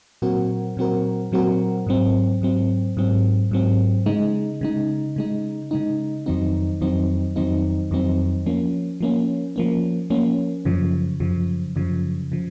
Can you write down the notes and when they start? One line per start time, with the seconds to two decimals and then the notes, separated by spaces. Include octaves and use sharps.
0.22 A#2 F#3 C4 F#4 A#4
0.77 A#2 F#3 C4 F#4 A#4
1.32 A#2 F#3 C4 F#4 A#4
1.86 G#2 F#3 C4
2.41 G#2 F#3 C4
2.97 G#2 F#3 C4
3.51 G#2 F#3 C4
4.06 C#3 G#3 D#4
4.61 C#3 G#3 D#4
5.16 C#3 G#3 D#4
5.71 C#3 G#3 D#4
6.26 F2 D#3 F#3 C4 D#4
6.81 F2 D#3 F#3 C4 D#4
7.36 F2 D#3 F#3 C4 D#4
7.91 F2 D#3 F#3 C4 D#4
8.46 F3 A#3 C#4
9.01 F3 A#3 C#4
9.56 F3 A#3 C#4
10.10 F3 A#3 C#4
10.65 F#2 C#3 F3
11.20 F#2 C#3 F3
11.76 F#2 C#3 F3
12.32 C#3 F3